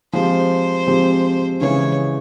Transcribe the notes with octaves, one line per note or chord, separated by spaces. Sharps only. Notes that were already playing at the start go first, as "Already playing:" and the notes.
F3 G#3 C4 G4 C5
F3 G#3 C4 G4
C#3 E3 G#3 C#5